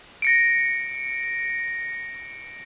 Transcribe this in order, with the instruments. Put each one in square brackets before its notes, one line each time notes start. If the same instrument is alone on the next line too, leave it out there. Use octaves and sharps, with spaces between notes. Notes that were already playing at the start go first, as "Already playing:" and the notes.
[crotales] A#6 C#7 D7